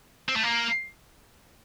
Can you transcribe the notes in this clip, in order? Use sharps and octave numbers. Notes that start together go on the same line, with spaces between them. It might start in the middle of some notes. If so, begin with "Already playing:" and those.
C4
A3
A#3